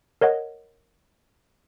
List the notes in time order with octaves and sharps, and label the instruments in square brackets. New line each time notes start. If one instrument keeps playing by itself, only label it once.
[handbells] A#4 C#5 D#5 F#5